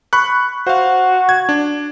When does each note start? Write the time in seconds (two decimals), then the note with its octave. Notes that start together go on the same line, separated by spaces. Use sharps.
0.13 B5 C#6 F#6
0.67 F#4 C5 F5
1.29 G#6
1.49 D4